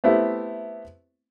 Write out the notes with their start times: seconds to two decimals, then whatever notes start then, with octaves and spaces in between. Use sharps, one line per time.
0.04 A3 B3 C4 E4 G4